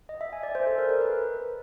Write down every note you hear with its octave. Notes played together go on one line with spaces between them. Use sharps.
D#5
E5
G#5
D5
C5
A4
A#4
A#4
B4